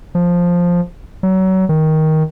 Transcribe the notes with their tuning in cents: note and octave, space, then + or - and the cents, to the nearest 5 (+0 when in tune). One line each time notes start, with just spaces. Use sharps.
F3 +5
F#3 +30
D#3 +10